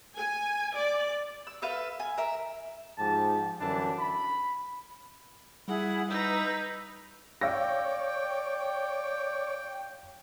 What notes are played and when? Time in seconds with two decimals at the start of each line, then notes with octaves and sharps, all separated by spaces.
0.16 G#5
0.76 D5
1.47 E6
1.62 A4 B4 E5 F5
2.00 G#5
2.18 A#4 E5
2.98 G#2 F3 G4 A5
3.60 F#2 D3 E3 G3 D4 A5
3.98 B5
5.68 G3 E4 G#4 F#5 B5
6.10 D#4 B4 A#5 E6 G6
7.41 C#5 D5 F5 G5 E6 A#6